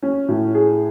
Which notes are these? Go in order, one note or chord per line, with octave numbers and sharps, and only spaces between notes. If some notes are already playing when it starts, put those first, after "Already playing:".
C#4
A2
G#4